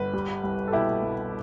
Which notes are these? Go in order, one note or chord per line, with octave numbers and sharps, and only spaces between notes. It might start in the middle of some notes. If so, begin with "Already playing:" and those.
Already playing: G1 B4
G3
C2
A4
B2 E4 G4
C2